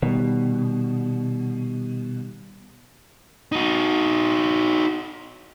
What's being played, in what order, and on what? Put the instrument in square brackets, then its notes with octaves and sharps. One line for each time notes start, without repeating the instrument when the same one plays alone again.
[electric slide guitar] B2 [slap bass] D#3 G3
[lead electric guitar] D#4 F#4